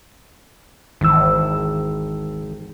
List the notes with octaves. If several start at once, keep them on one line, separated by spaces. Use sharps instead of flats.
G#1 D#2 E3 E6